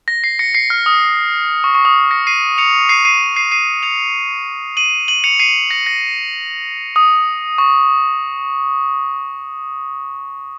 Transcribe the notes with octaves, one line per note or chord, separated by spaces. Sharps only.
A#6
C7
A#6 C#7
C7
F6
D#6
C#6
C#6
D#6
A#6 C#7
C7 D#7
C#7 F7
C7 D#7
C7 D#7
C7 D#7
C7 D#7
C#7 F7
D#7 F#7
D#7 F#7
C#7 F7
C7 D#7
A#6 C#7
A#6
D#6
C#6